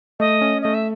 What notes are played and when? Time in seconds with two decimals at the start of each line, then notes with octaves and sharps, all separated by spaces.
0.20 A3 D#5
0.41 C#4
0.62 A3 D#5
0.74 E5